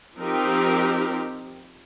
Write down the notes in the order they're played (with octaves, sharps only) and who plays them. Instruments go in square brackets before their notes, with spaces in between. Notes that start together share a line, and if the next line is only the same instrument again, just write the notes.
[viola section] F3 C4 D#4 G4 A#4